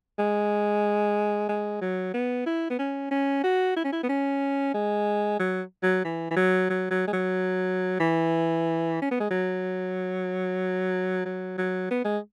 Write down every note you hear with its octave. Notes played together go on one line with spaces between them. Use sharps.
G#3
G#3
F#3
B3
E4
B3
C#4
C#4
F#4
E4
C#4
E4
B3
C#4
G#3
F#3
F#3
E3
E3
F#3
F#3
F#3
G#3
F#3
E3
C#4
B3
G#3
F#3
F#3
F#3
B3
G#3